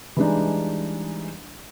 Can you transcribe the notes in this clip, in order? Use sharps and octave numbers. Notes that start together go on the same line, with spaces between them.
E3 G3 G#3 D4 D#4